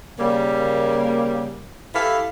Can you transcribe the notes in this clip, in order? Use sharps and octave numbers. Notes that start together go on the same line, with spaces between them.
C#3 G3 A#3
E4 G4 A4 F5